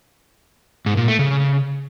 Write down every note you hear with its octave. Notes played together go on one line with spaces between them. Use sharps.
G#2
A#2
A3
C#3